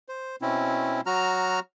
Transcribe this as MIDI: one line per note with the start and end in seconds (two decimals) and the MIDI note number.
0.08 0.36 72
0.42 1.01 47
0.42 1.01 60
0.42 1.01 61
0.42 1.01 64
1.06 1.60 54
1.06 1.60 66
1.06 1.60 82
1.06 1.60 89